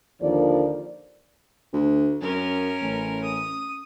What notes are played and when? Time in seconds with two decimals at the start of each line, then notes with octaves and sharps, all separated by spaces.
0.22 D#2 D3 F3 A#4 D5
1.73 D2
2.21 F#2 C#4 A#4
2.82 A1
3.23 D#6